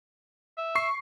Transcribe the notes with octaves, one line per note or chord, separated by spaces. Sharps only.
E5
C#6 C7